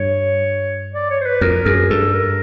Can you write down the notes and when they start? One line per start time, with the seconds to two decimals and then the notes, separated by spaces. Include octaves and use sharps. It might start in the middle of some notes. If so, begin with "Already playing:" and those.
Already playing: G2 C#5
0.94 D5
1.10 C#5
1.21 C5
1.26 B4
1.41 F2 A#4
1.66 F#2 G#4
1.90 G2 A4
2.14 A#4